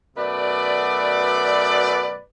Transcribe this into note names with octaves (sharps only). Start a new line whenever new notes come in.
F#2 B2 A3 B4 D5